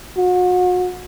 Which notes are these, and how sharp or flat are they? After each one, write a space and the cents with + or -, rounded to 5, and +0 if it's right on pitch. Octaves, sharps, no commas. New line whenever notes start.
F#4 -35